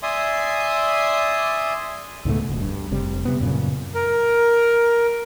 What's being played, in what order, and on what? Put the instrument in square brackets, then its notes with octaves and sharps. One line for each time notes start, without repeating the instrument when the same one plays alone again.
[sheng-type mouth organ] D5 E5 G#5 C6 D#6
[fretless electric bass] C#2 G#2 B2 A3
D#1 D2
G2
F1 C3 G3
C3 B3
F#2 A#2 C#3
[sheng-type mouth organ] A#4